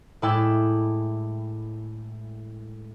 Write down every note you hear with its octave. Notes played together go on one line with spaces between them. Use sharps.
A2 G#3 E4 D5 G5 E6